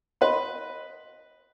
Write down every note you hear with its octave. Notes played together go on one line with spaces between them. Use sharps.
B4 D#5 C6